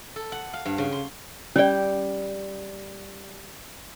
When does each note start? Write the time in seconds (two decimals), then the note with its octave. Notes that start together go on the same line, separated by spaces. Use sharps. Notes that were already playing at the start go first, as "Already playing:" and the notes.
0.16 A4
0.32 F#5
0.53 F5
0.65 G2
0.78 C#3
0.92 C6
1.56 G3 C#4 D5 G5